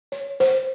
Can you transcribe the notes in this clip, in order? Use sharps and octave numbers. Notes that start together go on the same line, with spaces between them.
C#5
C5